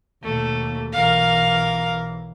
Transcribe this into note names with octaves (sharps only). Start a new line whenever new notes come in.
D#2 B2 A3
B1 E3 A#4 F5